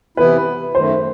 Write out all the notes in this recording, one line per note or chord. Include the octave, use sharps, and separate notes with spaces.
C3 E3 B3 E4 B4
F#2 D#3 A3 C5